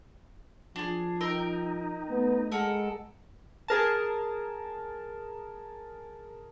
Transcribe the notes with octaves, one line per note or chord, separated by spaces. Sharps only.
F3 D4 G#4
D#4 A#4 G5 E6
A3 B3
G#3 A4 A#4 F#5
G#4 A#4 A5